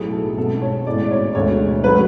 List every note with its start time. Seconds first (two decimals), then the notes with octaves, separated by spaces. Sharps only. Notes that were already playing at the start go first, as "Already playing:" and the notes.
Already playing: B1 A2 F#3 B3 G#4
0.12 A4
0.37 B1 B2 G#3 B3 A4
0.62 C#5
0.86 B1 A2 G#3 D5
1.05 D5
1.11 C#5
1.35 E1 D2 D3 G#3 C#5
1.84 F#3 A3 B4